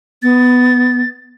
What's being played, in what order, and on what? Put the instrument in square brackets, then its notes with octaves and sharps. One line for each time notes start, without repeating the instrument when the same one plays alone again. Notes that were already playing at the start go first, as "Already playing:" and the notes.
[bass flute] B3 [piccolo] A6